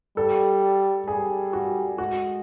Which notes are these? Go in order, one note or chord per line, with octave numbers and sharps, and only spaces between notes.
G3 A4
G3 G#4
F#4
G#3 F#4